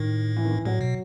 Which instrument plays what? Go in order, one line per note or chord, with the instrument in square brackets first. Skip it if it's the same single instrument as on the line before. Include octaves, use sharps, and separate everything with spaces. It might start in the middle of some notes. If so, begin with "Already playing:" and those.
Already playing: [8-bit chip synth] A2 [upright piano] D#3
[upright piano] E3
D#3
E3
[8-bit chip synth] A2 [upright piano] F#3
[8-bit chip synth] B2